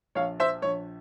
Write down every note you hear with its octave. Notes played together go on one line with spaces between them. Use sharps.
A#1 C#5 F5
C5 E5
A#1 C#5